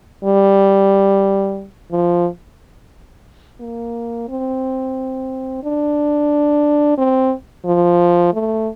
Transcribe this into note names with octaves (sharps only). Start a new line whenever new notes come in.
G3
F3
A#3
C4
D4
C4
F3
A3